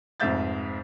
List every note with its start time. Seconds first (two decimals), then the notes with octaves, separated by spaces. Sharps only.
0.20 F1 F2 G#2 E5 G6 A6